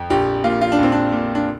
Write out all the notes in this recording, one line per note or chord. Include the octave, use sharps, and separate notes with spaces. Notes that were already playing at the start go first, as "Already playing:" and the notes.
Already playing: F2
A#1 G4
A#2 F4
F4
D4
A#1 C4
D4
A#2
D4